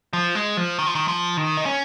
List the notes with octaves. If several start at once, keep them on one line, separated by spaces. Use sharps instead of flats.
F3
G#3
F3
D#3
F3
D#3
F3
D#3
D#4
C#4